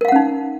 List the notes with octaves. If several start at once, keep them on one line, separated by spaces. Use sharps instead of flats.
C#4 D#4 A#4 F5 F#5